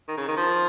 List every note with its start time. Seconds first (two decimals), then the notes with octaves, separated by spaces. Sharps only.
0.08 D#3
0.18 C#3
0.28 D#3
0.37 F3